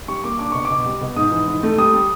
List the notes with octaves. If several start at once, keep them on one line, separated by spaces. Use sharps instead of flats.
G3 C#6
A#3 D6
D4 D6
B2 C#6
D6
B2
G3
B2
G#2 D#6
E3
G#2
A3
G3 D#6
G3